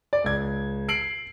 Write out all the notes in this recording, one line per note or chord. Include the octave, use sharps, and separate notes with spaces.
D5
C#2 G#6
C7 D7 F#7